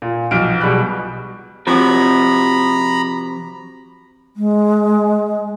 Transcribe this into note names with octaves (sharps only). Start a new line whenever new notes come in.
A#2
B1 F3 F6 D7
B2 G3 G#4 B5 F#6
C3 F3 F#4 A#5 B5
G#3